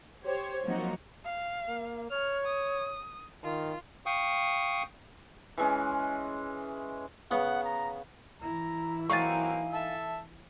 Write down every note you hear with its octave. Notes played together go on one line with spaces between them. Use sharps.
G4 C5 C#5
F3 F#3 A#3 C4 D#4 F#4
F5
A#3
C#5 F6
D#6
D#3 F4
F5 G5 C#6 D#6
E3 G#3 C#4
C#3 B3 F#5
A#5
E3 E4 A#5
F#3 A#3 C4 D#4 F5 G#5 C#6 A6
A4 E5 A5